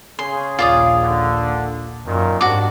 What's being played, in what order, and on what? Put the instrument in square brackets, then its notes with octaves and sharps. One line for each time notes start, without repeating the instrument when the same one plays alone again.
[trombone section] C#3 G#4 [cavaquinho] C6
[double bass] A#1 D#2 [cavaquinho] F4 D5 D#6
[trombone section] D3
[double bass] F#2 [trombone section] A#2 D#3
[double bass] G#2 [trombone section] G3 C4 D4 [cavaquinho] F#4 D6